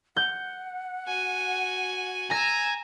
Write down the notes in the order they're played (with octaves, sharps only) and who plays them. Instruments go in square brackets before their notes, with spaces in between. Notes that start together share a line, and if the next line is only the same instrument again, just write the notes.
[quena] F#5 [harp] G6
[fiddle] F#4 G#5
[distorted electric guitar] G#5 [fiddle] A#5 E6 [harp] A#6